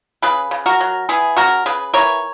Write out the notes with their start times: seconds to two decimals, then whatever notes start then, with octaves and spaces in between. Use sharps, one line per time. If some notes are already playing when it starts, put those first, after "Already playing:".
0.22 C#3 G#4 B4
0.51 C#3
0.66 F#4 A#4
0.80 F#3
1.09 B3 E4 G#4
1.37 C#3 F#4 A#4
1.66 C#3 G#4 B4
1.94 E3 A#4 C#5